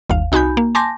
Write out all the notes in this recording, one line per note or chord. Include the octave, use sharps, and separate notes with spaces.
G1 D#2 F5
C2 D#4 F#4 G#5 B5 G6
A#3
G#5 A5 C6 D6 G6 A#6